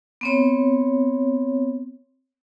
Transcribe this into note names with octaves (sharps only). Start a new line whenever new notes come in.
B3 C4 C#5